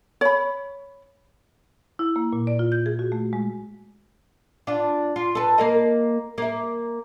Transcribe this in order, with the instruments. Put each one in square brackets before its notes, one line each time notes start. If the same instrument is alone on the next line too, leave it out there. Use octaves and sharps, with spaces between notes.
[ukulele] C#5 B5
[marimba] E4
A#3
A#2
D5
F4
G6
G#4
F#4
A3
G#3
[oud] D4 F4
F4
A4 B4
A#3 A#4 D#5
A#3 E5